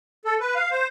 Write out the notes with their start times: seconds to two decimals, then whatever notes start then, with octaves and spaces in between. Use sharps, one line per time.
0.25 A4
0.40 B4
0.55 F5
0.71 C5